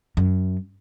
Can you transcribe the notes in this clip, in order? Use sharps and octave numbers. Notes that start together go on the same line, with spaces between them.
F#2